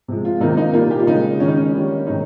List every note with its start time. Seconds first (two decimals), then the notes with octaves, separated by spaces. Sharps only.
0.08 C3 F3 G#3
0.25 F4
0.40 C3 D#3 A#3 D#4
0.57 D#4
0.74 A#2 G3 A#3 F4
0.91 G4
0.99 F4
1.07 C#3 G#3 D#4
1.40 D#3 G#3 C#4
1.48 D#4
1.57 C#4
1.74 D#3 G3 A#3
2.07 C3 D#3 G#3 D#4